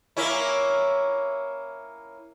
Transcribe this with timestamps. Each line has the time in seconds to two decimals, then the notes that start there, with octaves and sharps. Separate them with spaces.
0.17 A#3 C#4 E4